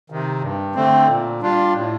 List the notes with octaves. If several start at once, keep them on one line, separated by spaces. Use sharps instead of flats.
C3 D#3
G2
D3 A3 C4
A#2
G3 D4 F4
A2